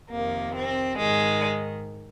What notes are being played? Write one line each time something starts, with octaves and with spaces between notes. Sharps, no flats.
F2 C3 D#3 A#3
C4
G#2 D#3 G#3